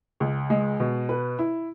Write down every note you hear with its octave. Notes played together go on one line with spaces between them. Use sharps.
C#2
G#3
B2
B4
E4